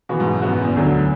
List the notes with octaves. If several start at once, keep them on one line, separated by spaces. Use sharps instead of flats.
B2 E3 B3 F#4
G#2
F#2
F#2 E3 B3 F#4
F#2
E2
D2 D3 F#3